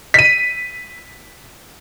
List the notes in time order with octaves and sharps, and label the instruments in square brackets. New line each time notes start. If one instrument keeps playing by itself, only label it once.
[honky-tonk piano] B6 D#7